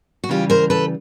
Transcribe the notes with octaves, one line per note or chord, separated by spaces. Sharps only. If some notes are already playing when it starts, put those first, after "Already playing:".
F#4
C#3 E3 G3 F4 G4
A#4 C5
A4 B4